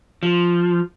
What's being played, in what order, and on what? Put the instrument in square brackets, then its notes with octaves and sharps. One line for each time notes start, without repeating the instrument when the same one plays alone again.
[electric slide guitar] F3